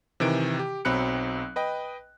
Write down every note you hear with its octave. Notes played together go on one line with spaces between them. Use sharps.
C3 D#3 E3 D7
G4
B1 F#3 C4 B5 F#6 C#7
B4 D#5 G5